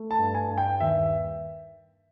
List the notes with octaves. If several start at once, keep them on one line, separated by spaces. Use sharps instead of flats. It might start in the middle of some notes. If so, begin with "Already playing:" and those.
Already playing: A3
A5
G2
G#5
G2
G5
D#2 E5